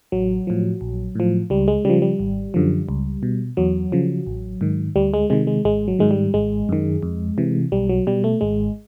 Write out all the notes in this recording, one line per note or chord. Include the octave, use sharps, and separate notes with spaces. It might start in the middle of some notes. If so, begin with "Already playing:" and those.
A1 F#3
A2 F3
A#1
A2 F3
C#2 G3
G#3
C#3 F3 G3
G3
G#1
F#2 D3 F3
C#2
B2
E2 F#3
C#3 F3
A1
G#2 D#3
D2 G3
G#3
C3 D#3 G#3
G#3
G#1 G#3
F#3
G#2 D#3 G#3
G3
G#1 G#3
F#2 D#3
F2
C3 E3
B1 G3
F#3
B2 G3
A3
G#1 G#3